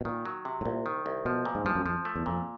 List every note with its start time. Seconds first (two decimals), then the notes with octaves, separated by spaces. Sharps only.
0.01 B2
0.05 A#2 D#3
0.25 F#3
0.45 C3
0.61 A2
0.65 C2 A#2
0.86 D#3
1.06 C2
1.25 B2 F3
1.45 A#2
1.55 G#2
1.65 G2 F3
1.75 F#2
1.86 F2 F3
2.05 A3
2.16 E2
2.26 F2 A#2